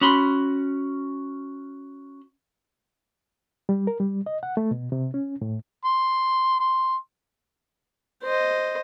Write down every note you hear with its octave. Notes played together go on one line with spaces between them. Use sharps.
C#4 F#4 B5 C6
G3
A#4
G3
D#5
F#5
A3
B2
C3
C#4
A2
C6
C6
C5 D#5